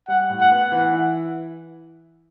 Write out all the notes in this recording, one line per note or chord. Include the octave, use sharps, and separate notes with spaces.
G3 F#5
A2
F#5
B3
E3 F#5
E4